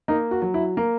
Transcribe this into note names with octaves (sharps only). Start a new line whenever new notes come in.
A#3 D#4
F#4
F#3
E4
A#3